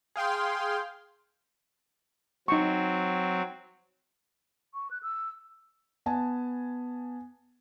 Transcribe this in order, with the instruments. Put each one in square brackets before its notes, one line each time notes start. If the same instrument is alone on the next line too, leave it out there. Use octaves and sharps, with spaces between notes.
[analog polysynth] G#4 F5 G5 C6
[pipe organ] F#3 C4 [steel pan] D#4 C#6
[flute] C#6
F#6
E6
[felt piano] B3 G#5 A5